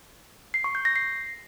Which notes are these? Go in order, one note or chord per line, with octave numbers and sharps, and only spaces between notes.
C7
C#6
G6
A#6
C7